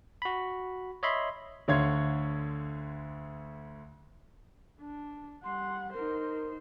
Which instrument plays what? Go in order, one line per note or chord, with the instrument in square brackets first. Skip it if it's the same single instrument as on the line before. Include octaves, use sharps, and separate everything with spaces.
[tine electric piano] F#4 B5
C#5 D#5 E5 B5 C6
[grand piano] D2 D3 C#5 F5 C6 G#6
[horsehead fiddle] D4
[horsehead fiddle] G3 F#5 [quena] C6
[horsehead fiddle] D#4 C5 [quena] A#4